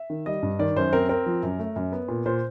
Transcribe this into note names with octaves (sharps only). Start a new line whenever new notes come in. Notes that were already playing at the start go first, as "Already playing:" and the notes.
Already playing: E5
D#3
G3 D#5
G2
D#3 D5
F#2 C5
C4 A#4
C4 A#4
F3
F#2
A3
F#2
B3
A#2
A#2 C5